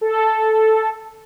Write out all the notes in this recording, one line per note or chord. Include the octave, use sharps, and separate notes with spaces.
A4